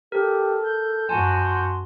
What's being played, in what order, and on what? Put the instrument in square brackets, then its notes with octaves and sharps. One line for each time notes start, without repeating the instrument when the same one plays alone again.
[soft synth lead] G4 [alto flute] A4 [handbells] A#4
[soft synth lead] G6
[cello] F#2 F#4 [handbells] G#5 A5 [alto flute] C6